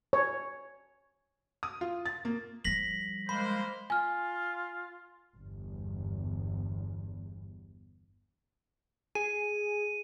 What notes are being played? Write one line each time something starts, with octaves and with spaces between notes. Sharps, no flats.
C#5
D#6
F4
A6
A#3
F3 G3 A#6 B6 F#7
G#3 A#3 C5 B5
F4 G#5 F6
G1 E2
G#4 D#7